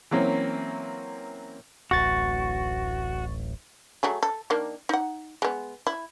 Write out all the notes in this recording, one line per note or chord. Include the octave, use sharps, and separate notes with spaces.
E3 F#3 A#3 C4 C#4
D1 A1 F#4 C#6 A6
F#3 A3 G#4
A4
D#3 A#3 D4
D#4 F#5
G#3 B3
E4